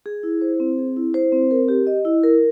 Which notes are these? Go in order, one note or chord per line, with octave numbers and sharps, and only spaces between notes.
G#4
E4
C5
C4
G#4
E4
C5
C4
A#4
G4
D#5
E4
A#4